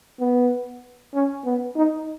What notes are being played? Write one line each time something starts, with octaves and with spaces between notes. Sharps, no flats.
B3
C#4
B3
D#4